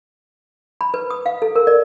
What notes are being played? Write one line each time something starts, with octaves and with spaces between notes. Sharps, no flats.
B5
B4
D#6
F5
A4
A#4
D5